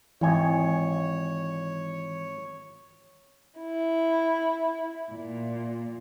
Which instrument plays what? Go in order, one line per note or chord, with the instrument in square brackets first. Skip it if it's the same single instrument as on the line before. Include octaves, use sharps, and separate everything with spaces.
[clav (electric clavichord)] G#1 G#5 [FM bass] E3 [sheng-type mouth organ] C#5
[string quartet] E4
A#2